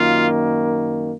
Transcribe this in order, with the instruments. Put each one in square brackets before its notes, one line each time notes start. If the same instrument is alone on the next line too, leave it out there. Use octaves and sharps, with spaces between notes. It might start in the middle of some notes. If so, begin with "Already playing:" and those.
Already playing: [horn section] F#2 D#3 A#3 F4